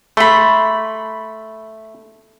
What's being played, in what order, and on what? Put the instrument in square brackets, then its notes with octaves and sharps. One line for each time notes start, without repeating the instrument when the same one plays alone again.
[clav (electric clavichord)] A3 [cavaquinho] B5 C6